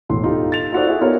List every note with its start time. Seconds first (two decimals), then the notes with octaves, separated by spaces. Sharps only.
0.09 E1 A2 C6
0.24 D#4 F4 G4 A4
0.52 A6 F7
0.72 D#4 F4 F#4 A4 C5 D5
0.87 E4 F#4 G#4
1.01 B3 D#4 F4 G4 A#4 C#5